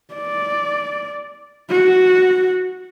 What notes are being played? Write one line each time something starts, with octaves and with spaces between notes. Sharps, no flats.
D5
F#4